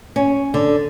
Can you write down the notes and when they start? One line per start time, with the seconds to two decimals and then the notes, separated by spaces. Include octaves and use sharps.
0.16 C#4
0.54 D3